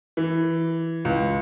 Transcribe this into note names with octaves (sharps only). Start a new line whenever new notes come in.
E3
C#2